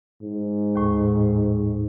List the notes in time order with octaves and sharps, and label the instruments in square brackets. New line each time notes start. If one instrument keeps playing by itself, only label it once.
[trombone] G#2
[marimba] D#2 A2